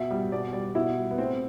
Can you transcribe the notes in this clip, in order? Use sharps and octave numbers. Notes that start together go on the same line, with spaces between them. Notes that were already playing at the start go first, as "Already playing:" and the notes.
Already playing: B2 E5
G3
B2 D5
G3 D5
B2 E4
G3
B3
A2 C4